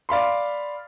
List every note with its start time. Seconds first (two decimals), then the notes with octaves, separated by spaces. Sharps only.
0.09 D5 F5 B5 C6